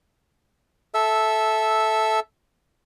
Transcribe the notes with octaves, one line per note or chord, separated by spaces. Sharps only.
A4 E5 E6